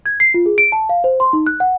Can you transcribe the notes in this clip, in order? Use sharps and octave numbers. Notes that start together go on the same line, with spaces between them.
G#6
C7
F4
G#4
D7
A5
F5
C5
C6
D#4
F#6
F#5